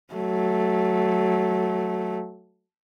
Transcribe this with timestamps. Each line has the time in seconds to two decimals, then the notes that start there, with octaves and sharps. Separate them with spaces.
0.14 F#3 A3